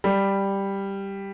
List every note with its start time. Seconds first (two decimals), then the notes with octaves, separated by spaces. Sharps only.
0.04 G3